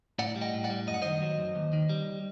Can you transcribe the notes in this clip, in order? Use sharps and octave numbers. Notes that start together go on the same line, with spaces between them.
A2 D5 F#5
G3
D#5 G5
A2
D5 F#5
G3
F#2 D#5
F#5
D#3 C5 D#5
F#3
F#2
D#2
D#3
G3